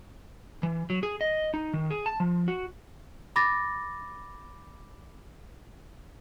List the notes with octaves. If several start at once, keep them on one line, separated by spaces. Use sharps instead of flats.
E3
F#3
G#4
D#5
D#4
D#3
G#4
A5
F3
F#4
B5 D6 A6 A#6